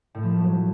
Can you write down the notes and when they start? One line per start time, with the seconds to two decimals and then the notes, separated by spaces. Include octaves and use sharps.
0.14 A2
0.23 F3
0.31 A3
0.40 F#3